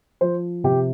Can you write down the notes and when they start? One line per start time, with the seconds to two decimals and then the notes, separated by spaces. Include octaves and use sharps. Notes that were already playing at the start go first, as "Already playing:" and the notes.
0.21 F3 C5
0.64 C3 G4